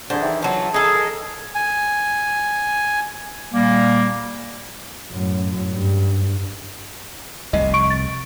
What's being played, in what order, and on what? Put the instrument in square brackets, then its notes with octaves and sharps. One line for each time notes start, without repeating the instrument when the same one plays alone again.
[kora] D3 E3 G#4 [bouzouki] C5
[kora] D#3 E3 [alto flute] E5
[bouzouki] F#3 F4 [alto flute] A5
[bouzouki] D#4 A4 [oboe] G#4
[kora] A#4
[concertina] G#5
[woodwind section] A#2 G3 A#3
[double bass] F#2 A2
G2
[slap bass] F1 C2 C3 [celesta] D#5
[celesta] C#6 D7
A6